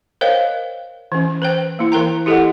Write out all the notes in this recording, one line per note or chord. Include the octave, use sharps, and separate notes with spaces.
A#4 C5 C#5 D#5 F5 G5
E3 C#4
B4 C5 G5
A#3 E4
E3 A#4 G5 A#5
E4 G4 A4 B4 D#5 F#5